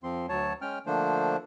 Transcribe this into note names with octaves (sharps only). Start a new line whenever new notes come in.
F2 F3 C4 C6
D2 F#3 C#5 A5
G#3 C#4 G5 F6
D3 F3 A3 A#3 D4 C5